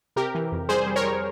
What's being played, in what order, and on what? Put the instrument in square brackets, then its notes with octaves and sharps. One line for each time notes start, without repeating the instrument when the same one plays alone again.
[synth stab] C3 G4 A#4
E3
F2
G3 G#4 C5
G3
A#4 C#5
G3